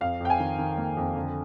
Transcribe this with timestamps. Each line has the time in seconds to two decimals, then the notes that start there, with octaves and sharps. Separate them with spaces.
0.01 F2 F5
0.20 F2 G5
0.30 G#5
0.39 D#3
0.58 D#3
0.77 A#3
0.97 F2
1.16 D3